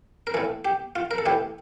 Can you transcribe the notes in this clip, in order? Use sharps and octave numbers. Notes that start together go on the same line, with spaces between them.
A#4
A2 E3 A4
G4
F4
A#4
A4
A2 E3 G4